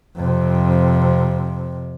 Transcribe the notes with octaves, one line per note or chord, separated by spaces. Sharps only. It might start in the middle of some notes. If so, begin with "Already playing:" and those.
F2 C3